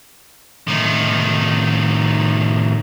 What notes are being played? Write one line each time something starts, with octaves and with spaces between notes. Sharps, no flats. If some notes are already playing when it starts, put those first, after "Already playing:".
A2 D#3